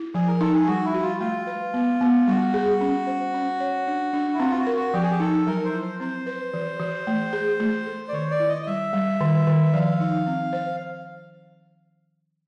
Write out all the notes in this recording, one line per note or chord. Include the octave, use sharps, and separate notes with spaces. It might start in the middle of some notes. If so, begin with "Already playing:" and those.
Already playing: E4
F3 G#4
A#4
D#4 A4
G#4
G3 F#4
E4
F#4
F4
A3 F4
B4
B3
B3
G3 F#4
G#4
C#4
C5
C#4
C#5
D4
D4
E4
C4 F4
F4
F#4
A#4
F#4
F3 G4
G#4
G4
D#4 A4
F#3 A#4
C5
E4
C5
C4 C5
B4
E3
E3
A3
G#4
A3
A4
D5
D#3 C#5
D5
E4
D#5
D#5
G3 E5
G3
D#3
D#3
F3 F5
D#4
C4
C5